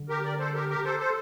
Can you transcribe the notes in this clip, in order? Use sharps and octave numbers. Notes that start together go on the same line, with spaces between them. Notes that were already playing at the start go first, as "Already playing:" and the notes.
Already playing: D3
G4 A#4
A#4 D5
A4 C5
G4 A#4
G4 A#4
A4 C5
A4 C5